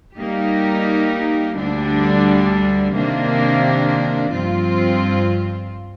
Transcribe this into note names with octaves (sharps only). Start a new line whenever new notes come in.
G3 A#3 D#4 G4
D2 D3 G3 D4
C3 D#3 A#3 D4
G2 F3 C4 F4